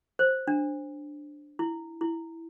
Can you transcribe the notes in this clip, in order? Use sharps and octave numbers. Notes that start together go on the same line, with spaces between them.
C5
D4
E4
E4